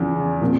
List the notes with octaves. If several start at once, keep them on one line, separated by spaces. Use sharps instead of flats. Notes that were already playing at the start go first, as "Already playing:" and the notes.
Already playing: E2 C#3 F3
A#2 F3 C4